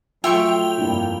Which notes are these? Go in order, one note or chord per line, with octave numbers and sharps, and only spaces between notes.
F#3 A3 F4 E5 G5 C6 C#6 F7
F1 G2 A#3 D4 E4